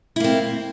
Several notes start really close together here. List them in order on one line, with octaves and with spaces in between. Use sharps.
E4 A#3 C4